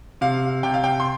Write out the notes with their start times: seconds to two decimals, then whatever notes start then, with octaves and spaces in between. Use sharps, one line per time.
0.21 C3 F5
0.63 C3 G5
0.74 F5
0.84 G5
1.00 C6